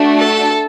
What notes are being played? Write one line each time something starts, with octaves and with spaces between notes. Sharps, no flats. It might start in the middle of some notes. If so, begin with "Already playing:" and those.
Already playing: A3 D4 F#4
A4